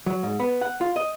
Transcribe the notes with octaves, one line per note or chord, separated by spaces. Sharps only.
F#3
G#2
B3
F#5
F4
D#5